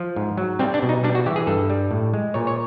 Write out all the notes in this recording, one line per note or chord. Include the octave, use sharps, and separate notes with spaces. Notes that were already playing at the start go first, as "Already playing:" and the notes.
Already playing: F3
G#2
F#3
G3 C4
D4
B2
D#4
G3 D4
F#4
E3 G4
G#4
G2 A4
G3
A2
G#3
A#2 C#5
C#5